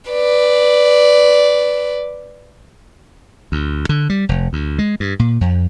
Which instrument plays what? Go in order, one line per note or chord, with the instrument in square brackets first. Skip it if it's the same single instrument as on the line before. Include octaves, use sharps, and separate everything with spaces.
[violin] B4 D5
[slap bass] D2
D3
G3
F1
D2
G#3
G2
A#2
F2